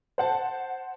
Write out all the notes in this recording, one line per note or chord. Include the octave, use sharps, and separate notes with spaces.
C5 F#5 A5